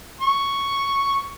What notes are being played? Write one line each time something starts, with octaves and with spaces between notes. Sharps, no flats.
C#6